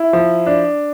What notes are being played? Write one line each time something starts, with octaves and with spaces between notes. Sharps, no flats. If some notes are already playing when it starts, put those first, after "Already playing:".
Already playing: E4
F3
D4